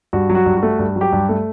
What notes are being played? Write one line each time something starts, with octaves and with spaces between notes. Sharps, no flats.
G2 F#4
F#3
F#4
G2
F#4
A3
G2
F#3
G4
G2
A3